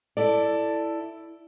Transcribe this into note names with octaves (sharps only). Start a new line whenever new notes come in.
E4 A4 D5